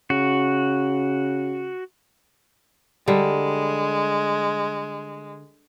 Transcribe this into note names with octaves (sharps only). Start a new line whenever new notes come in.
C#3 F#4
D3 G3 G#3